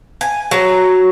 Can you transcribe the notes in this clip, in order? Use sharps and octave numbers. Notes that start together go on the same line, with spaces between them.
G#5
F#3